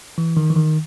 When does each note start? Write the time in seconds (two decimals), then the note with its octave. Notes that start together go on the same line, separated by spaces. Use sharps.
0.18 E3
0.37 D#3
0.50 E3
0.56 D#3